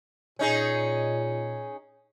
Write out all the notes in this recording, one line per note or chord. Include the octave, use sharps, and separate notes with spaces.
A#2 C#4 D#4 G#4